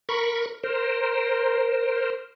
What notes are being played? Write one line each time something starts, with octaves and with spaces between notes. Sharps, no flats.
A#4 B5 C#6
A#4 C5